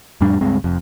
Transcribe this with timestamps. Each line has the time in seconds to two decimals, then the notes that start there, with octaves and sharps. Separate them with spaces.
0.21 F2 A2 G3 D4
0.41 C#2 G2 G#3 C4
0.64 F1 F2